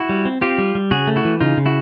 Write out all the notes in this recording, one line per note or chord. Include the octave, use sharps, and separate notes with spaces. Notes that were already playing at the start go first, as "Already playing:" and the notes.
Already playing: E4 F#4
G3
C4
C4 F4 G4
G3
G3
C#3 F#4 G#4
A3
E4 F#4
E3
C#3 D#4 F4
C#3
E4 F#4